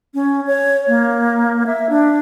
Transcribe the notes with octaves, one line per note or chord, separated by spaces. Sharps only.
C#4
C#5
A#3
E5
D4